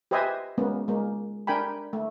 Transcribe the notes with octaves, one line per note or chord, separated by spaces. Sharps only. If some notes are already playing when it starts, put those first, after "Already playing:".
G4 B4 C5 D#5 E5 G#5
G#3 A#3 B3 C#4
G#3 A#3
D4 A#4 G5 G#5 B5
A3